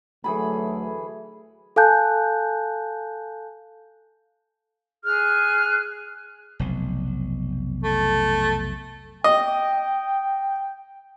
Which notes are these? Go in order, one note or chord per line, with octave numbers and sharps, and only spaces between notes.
D2 E3 F#3 A3 G#4 B5
A4 F5 G#5 A5 F#6 G6
G#4 F6 F#6
F1 B1
A3
D#5 G5